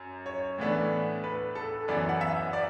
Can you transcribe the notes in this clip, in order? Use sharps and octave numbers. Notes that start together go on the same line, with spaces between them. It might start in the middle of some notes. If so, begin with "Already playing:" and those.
Already playing: F#2
C#5
A2 E3 B3 D4
B4
A4
F#2 E3 B3 D5
F#5
E5
D5